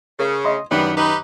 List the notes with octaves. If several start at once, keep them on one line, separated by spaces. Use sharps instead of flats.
C#3 A#4
D#5 C6
F#2 D#3 E3 G3 B3 F#6
D#4 G4 B4